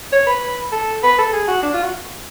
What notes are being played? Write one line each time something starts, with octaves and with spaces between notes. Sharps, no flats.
C#5
B4
A4
B4
A4
G#4
F#4
D4
F4
F#4